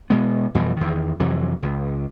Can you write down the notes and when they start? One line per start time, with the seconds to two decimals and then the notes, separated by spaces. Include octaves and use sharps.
0.10 B2 G#3 B3
0.55 F2 B2 E3 G3
0.76 E2 D#3
1.20 F2 C3 E3 F#3
1.62 C#2